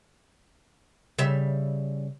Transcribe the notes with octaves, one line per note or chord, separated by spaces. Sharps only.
C#3 G3 E5